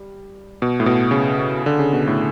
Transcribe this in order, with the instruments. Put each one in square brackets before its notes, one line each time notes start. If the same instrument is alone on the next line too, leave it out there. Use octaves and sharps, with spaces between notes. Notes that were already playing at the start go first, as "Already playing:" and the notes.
Already playing: [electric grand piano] G3
B2
A2
B2
C#3
D3
C#3
B2
A2